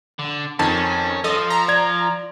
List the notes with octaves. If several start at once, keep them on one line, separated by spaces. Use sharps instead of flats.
D3
F2 D#3 C#4 A5
F3 A4 D#5
A#5
D5 G#6